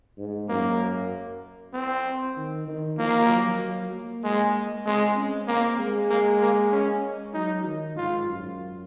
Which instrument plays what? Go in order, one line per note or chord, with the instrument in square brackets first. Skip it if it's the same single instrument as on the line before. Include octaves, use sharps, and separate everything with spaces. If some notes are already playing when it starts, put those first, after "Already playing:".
[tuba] G#2
[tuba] F#2 [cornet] A#3
[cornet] C4
[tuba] D#3
D#3
[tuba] F3 [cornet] A#3
[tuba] F#3
F#3
A#3
[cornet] G#3
[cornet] G#3 [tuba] C4
[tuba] C#4
[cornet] A#3 [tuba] C4
[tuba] G#3
[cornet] A#3
A#3
C#4
[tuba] F#3 [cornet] D#4
[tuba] D#3
[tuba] G#2 [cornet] F4
[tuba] F#2